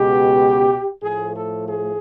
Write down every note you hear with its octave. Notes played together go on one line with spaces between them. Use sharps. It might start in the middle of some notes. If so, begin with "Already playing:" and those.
Already playing: C#2 B2 G#3 B3 G4
A2 F3 A3 G#4
A4
G#4